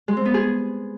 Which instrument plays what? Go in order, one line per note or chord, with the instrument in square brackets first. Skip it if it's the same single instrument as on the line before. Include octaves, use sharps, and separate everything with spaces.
[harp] G#3
C4
B3
G#4